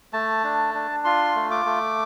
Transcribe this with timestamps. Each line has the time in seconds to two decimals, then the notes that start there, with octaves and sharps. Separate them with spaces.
0.13 A3 A5
0.44 D4
0.74 D4
1.05 F4 C6
1.36 A3
1.51 D6
1.66 A3